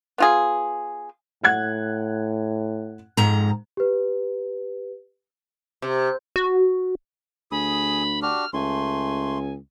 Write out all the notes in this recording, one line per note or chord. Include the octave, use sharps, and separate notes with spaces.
B3 F4 G#4
A2 F#5 F#6 G#6
F2 G#2 A#5
G4 B4
C3
F#4
D2 G#4 B5 D#6
D4 F#4 G4 F6
C#2 A3 G#5 C6